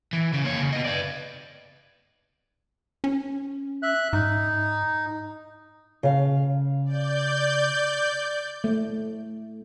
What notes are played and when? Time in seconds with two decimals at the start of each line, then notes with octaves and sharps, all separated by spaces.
0.13 E3
0.33 C#3
0.44 A#3 C#5
0.60 C#3
0.72 B3 D#5
0.85 B4 D5
3.04 C#4
3.83 E5 F#6
4.13 G#2 D#4
6.03 C#3 F5
6.85 D5 G6
8.64 A3